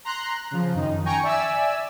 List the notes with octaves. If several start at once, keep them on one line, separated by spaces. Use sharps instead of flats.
A#5 C6 F#6
C#3 F3
F#2 D#3 D#4
G5 G#5 A#5 C#6
D5 E5 G#5 E6